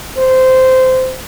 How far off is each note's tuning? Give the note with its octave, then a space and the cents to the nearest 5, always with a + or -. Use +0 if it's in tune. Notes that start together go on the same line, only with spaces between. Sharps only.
C5 -15